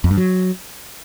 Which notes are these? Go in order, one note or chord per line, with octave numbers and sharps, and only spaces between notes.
F2
G2
F#3